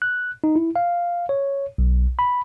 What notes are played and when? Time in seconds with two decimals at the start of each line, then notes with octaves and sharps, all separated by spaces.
0.02 F#6
0.44 D#4
0.56 E4
0.76 F5
1.29 C#5
1.78 B1
2.19 B5